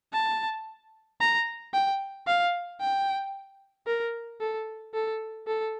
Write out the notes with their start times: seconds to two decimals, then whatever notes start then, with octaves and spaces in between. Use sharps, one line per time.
0.14 A5
1.21 A#5
1.74 G5
2.27 F5
2.81 G5
3.87 A#4
4.41 A4
4.94 A4
5.47 A4